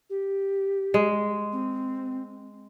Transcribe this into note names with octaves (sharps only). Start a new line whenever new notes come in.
G4
G#3
C4